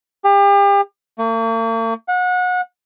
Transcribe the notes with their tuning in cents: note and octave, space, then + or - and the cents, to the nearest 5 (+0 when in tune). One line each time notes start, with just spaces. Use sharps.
G4 +35
A#3 -45
F#5 -30